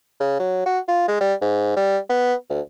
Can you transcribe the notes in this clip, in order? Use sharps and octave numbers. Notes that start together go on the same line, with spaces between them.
C#3
F#3
F#4
F4
G#3
G3
G#2
G3
B3
D2